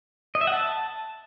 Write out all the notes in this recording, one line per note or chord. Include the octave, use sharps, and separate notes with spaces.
D#5
E5
F#5
A5